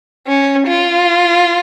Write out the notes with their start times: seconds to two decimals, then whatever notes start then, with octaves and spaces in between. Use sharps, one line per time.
0.27 C#4
0.68 F4